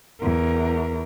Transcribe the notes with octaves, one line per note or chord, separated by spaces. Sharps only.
E2 A#4